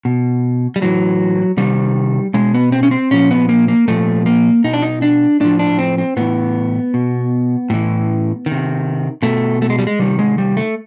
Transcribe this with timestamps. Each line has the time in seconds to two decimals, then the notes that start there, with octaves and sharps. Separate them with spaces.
0.05 B2
0.76 G3
0.81 A2 E3 F#3
1.57 C3 D#3 G3
2.34 B2 G#3
2.54 B3
2.72 C4
2.83 C#4
2.91 C4
3.11 A#2 F3 C#4
3.31 B3
3.49 A#3
3.68 A#3
3.88 A#2 F3 A3
4.26 A#3
4.64 B2 D#4
4.73 D4
4.83 D#4
5.02 D4
5.40 A2 F3 D4
5.59 D4
5.79 C4
5.98 C4
6.17 A2 E3 B3
6.94 B2
7.70 A2 E3
8.46 D#3
8.52 C3
9.23 B2 A3
9.62 A3
9.70 G#3
9.79 G3
9.87 G#3
9.99 C3 D#3 G3
10.19 G#3
10.38 G3
10.57 A3